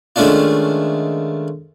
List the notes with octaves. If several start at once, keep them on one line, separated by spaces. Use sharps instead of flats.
D#3 G#3 A3 C#4 D4 F4